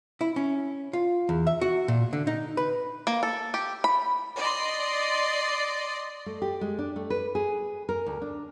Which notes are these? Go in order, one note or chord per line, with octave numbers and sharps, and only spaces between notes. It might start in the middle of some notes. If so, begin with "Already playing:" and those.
E4
C#4
F4
E2
E5
F#4
A#2
D3
D#4
B4
A#3
A4
G4
B5
D5 D#5 C6
A3
G4
G#3
D4
A3
B4
G#4
A#4
D2
D4